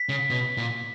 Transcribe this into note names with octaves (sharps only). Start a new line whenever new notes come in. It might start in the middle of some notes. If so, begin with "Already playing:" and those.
Already playing: B6
C#3
B2
A#2